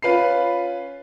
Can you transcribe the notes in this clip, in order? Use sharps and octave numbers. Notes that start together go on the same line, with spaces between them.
C#4 F4 B4 B5 C7